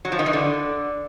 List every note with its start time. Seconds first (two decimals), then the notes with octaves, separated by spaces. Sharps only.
0.05 F#3
0.12 F3
0.19 D#3
0.26 E3
0.33 D3